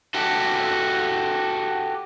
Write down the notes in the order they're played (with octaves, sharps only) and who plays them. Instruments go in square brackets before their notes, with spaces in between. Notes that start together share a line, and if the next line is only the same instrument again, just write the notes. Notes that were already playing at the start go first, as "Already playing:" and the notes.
[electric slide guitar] F#4 G4 A4